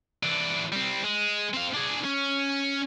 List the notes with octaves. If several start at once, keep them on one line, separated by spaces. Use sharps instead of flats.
E3 D4
G3 C4
G#3
C4 F5
D4 G#4
C#4